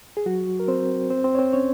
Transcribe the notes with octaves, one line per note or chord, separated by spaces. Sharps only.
G#4
F#3 F#4
A#4
C4 C5
C4 C5
C4 C5
C#5
C4 C5
C#4 C#5